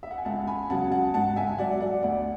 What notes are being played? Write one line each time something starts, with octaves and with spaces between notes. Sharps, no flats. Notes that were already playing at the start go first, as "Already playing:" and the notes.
E5
F#5
G#5
C#2 F#5 A5
G#5 B5
C#3 F#3 F#5 A5
F#5 A5
G#2 F#5 A5
E5 G#5
F#3 D5 F#5
D5 F#5
D2 D5 F#5